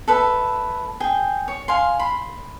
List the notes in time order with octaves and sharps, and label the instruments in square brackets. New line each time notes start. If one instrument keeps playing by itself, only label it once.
[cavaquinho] A4 B4 E5
G#4 G5
C#5
F5 G#5 C6
B5 C6